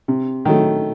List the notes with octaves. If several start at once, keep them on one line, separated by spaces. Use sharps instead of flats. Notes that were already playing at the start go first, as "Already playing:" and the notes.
C3
D#3 F#3 A3